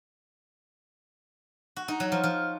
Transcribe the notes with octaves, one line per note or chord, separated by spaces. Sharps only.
F#4
D#4
F#3
F3
F3